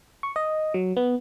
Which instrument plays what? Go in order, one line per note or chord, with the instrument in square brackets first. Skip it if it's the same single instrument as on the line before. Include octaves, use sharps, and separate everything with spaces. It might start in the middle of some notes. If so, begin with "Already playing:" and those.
[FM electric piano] C#6
D#5
F#3
B3